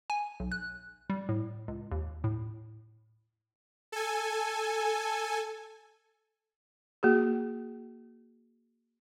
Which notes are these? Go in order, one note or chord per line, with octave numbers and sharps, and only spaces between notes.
G#5
B1
F#6
G3
A2
C#2
D#2
A2
A4 G#5
A#3 F#4 G#4